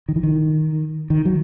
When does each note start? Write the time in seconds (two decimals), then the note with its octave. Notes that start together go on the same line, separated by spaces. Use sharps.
0.09 D#3
0.16 E3
0.23 D#3
1.10 D#3
1.25 F#3